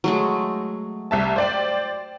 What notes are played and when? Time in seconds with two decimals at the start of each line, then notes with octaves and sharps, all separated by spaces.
0.04 F#3 G#3 A3
1.11 C2 E5 A5
1.36 C5 D5 G5